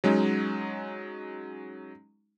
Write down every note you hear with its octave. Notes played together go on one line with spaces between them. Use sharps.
F#3 G#3 C#4 D#4